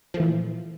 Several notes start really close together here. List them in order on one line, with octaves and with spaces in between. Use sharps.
F3 A3 E3 A#2